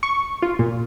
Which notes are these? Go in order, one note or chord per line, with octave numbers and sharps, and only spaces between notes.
C#6
F4
A#2